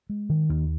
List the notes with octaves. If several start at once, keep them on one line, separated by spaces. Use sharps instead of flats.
G#3
D#3
D#2